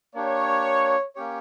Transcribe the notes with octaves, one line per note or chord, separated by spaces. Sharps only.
A#3 D4 G4 C#5
A#3 C#4 G4 C#5